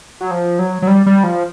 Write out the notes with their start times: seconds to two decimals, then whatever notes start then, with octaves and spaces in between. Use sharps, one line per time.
0.21 F#3
0.31 F3
0.59 F#3
0.82 F#3
0.87 G3
1.06 G3
1.24 F3